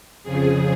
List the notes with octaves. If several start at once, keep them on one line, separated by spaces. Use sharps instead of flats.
F2 C#3 F3 G#4